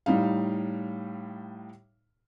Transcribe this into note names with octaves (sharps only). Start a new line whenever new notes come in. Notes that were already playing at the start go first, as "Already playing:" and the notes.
A2 G3 D#4 F5